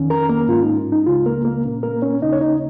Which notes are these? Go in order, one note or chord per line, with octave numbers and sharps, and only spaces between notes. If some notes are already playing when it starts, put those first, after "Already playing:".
Already playing: F2 D#3 C#4
A#4 A#5
A#3 A#4
G#2 G#3 C#4 F4
D#4
D#4
C#2 C#3 G#3 F4
A#3 A#4
A#3 A#4
A#2 A#3 C#4
A#3 A#4
C#4 C#5
D#2 C#3 A#3 C#4 D#4 D#5
C#5
D#4 D#5